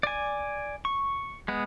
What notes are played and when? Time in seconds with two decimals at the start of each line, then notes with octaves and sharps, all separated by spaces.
0.03 D5 G#5
0.85 C#6
1.48 G#3 B3